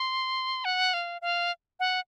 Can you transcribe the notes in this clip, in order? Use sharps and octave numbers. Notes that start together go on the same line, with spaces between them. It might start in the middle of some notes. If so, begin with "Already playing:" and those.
Already playing: C6
F#5
F5
F5
F#5